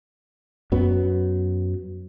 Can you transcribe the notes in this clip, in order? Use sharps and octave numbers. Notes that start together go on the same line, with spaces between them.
F#2 F#3 B3